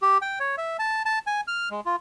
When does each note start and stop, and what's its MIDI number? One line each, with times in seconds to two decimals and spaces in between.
0.02 0.18 67
0.22 0.39 79
0.39 0.56 73
0.58 0.77 76
0.79 1.02 81
1.05 1.19 81
1.27 1.41 80
1.48 1.69 89
1.71 1.81 56
1.85 1.96 65